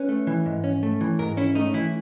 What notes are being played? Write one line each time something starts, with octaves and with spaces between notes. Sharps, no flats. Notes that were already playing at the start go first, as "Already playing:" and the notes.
Already playing: C#4 B4
A3
E3
G#2
C#4
A3
E3
G#2 A#4
C#4 E4
A3 D#4
E3 E4